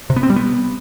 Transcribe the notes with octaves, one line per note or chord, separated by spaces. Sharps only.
C3
B3
C4
G3
B3